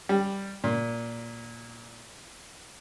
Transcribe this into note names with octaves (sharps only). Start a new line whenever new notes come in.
G3
A#2